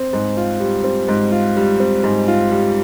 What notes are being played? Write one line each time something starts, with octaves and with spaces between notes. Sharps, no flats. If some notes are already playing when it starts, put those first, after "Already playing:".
Already playing: C4
G#2
F4
G3
C4
G#2
F4
G3
C4
G#2
F4
G3